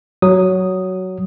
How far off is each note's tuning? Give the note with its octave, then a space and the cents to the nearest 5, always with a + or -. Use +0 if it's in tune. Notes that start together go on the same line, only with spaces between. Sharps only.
F#3 +10 D#6 +0